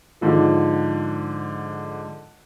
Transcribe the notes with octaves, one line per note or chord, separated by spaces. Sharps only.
G#2 D3 F3